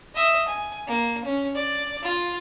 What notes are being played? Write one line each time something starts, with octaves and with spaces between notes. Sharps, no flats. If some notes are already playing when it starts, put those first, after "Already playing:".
D#5 E5
G#5
A#3
C#4
D5
F4